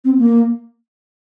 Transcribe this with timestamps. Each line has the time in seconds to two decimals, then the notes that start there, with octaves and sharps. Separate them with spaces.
0.04 C4
0.18 A#3